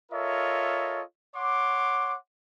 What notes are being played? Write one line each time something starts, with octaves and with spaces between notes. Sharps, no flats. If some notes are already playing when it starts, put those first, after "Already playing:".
F4 A4 A#4 C#5 D#5 E5
C#5 F#5 C6 D6